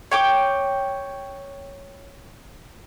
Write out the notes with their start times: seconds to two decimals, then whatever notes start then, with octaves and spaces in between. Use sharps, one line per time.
0.11 C#5 G5 D6